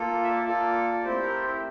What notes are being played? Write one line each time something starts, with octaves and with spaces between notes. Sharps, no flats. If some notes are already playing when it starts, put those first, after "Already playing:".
Already playing: A#3 F4 A4
E5
D5
A#3 F4 A4
A3 C4 E4 G4 C5
A#4
C5